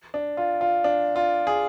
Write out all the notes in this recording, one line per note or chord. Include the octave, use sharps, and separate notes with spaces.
D4
F4
F4
D4
F4
G#4